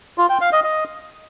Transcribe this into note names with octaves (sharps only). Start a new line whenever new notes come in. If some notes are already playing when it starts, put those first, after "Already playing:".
F4
G5
F5
D#5
D#5